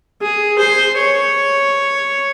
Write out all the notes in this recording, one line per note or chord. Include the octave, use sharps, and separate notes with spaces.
G#4
C5
C#5